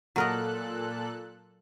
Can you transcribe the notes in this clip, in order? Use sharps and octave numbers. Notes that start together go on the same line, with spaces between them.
A#2 F#3 A4 A#4 D#5 F#6